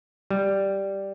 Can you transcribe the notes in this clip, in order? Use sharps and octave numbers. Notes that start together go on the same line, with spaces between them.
G3